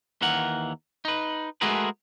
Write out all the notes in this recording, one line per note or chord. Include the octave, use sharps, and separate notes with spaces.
D#2 E3 A#4 F#5
D#4 B4
G#3 A3 F#4 G#4 A#4 B4